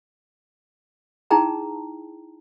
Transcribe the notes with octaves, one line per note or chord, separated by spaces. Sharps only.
D#4 E4 G#4 G5 A5 A#5